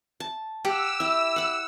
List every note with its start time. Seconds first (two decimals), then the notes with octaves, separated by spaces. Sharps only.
0.20 A5
0.65 G4 F#5 E6
1.00 E4 G5
1.36 F#5 B5